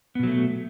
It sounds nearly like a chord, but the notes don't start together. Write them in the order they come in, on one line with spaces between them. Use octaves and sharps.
B3 B2 F#3 A3